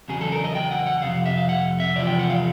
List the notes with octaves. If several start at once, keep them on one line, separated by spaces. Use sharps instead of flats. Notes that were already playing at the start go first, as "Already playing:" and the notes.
E2 C#3 F#3 G#4
A4
A#4
D#5
G5
F#5
F#5
F2 C3 F5
E5
F5
F#5
E5
E2 C3 F3 D5
G5
F#5
F5